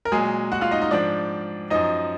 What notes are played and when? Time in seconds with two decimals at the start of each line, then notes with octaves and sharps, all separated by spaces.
0.05 A#4
0.12 A#2 F#3 G#3 G#4
0.52 F#4 F#5
0.61 F4 F5
0.71 D#4 D#5
0.81 D#4 D#5
0.91 G#2 F3 D4 D5
1.70 F#2 F3 D#4 D#5